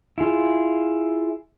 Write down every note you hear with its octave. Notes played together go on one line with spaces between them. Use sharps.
E4 F4 G#4